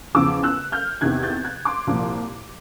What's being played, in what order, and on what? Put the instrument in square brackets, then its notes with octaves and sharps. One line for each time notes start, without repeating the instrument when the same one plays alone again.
[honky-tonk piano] E2 C#3 F3 D6 E6
E6 F#6
F6 G6
E2 C3 D#3 F#6 G#6
G6 A6
F#6 G#6
C6 D6
C2 A#2 F3